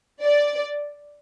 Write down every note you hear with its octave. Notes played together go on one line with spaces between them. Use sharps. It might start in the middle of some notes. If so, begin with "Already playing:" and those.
D5